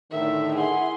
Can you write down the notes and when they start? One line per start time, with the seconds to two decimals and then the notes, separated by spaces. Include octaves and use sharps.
0.12 A2 D3 D#3 E5
0.57 E4 G#4 E5 F#5 C6